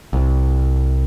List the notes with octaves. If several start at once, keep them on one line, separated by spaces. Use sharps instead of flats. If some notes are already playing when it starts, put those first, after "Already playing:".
C2